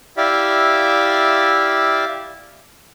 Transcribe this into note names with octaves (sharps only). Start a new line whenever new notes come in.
E4 G4 D5 E5 F5